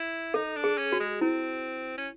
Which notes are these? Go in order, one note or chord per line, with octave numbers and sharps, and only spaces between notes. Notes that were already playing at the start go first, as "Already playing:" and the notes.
Already playing: E4
D#4 A4
D4
G#4
C#4
F#4
G#3
C4 E4
C#4